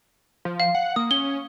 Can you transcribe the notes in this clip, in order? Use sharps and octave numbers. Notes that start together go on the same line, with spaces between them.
F3
F5
F#5
A#3 D#6
C#4 G7